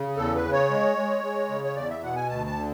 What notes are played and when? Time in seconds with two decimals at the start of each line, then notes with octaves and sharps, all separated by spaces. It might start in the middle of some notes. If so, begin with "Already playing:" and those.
Already playing: C#3
0.17 E2 A4
0.35 B4
0.44 C#3
0.53 C#5
0.70 G#3
0.97 G#3
1.24 G#3
1.49 C#3
1.64 C#5
1.76 E2 D5
1.90 E5
2.03 B2 F#5
2.16 G#5
2.29 D2 A5
2.46 A5
2.56 D3